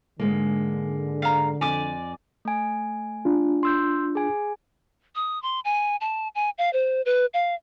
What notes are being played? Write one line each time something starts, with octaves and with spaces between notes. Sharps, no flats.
G#2 D3 G#3 A#3
F5 A#5
F2 D5 G#5 D6
A3 G#5
D4 F4
C6 E6 G6
G#4 G#5
D#6
C6
G#5
A5
G#5
F5
C5
B4
F5